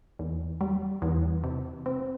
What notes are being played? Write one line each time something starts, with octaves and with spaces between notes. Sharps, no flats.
E2
G3
E2
C3
C4